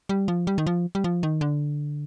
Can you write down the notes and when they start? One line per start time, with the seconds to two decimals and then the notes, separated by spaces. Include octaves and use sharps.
0.09 G3
0.28 F3
0.47 G3
0.58 D#3
0.67 F3
0.95 G3
1.04 F3
1.23 D#3
1.41 D3